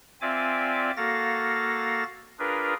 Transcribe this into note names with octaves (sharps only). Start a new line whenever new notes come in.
C4 F4 D5 E5 G#5 D6
A#3 F#4 A4 F5 A6 A#6
D4 F4 G#4 A#4 B4